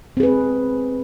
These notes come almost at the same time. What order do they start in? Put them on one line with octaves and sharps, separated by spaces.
C4 G#4 B4